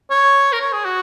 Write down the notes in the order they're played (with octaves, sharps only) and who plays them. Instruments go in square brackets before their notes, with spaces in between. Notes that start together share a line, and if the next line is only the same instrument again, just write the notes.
[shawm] C#5
A#4
C#5
G#4
F#4